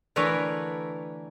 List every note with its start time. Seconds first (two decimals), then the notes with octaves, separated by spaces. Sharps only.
0.16 D3 E3 A3 A#4 B4 C#5